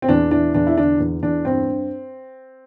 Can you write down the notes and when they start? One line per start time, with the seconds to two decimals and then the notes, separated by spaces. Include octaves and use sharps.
0.02 C4
0.09 E2 D4
0.31 E3 D4
0.55 E2 D4
0.67 E4
0.77 D3 D4
1.00 E2
1.23 E2 D4
1.45 G2 C4
1.68 G2